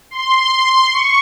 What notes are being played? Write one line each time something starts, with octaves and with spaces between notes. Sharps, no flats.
C6
C#6